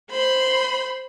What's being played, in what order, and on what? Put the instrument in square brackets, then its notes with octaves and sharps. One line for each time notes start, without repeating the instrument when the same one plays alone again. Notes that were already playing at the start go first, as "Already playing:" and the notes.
[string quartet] C5 B5 C6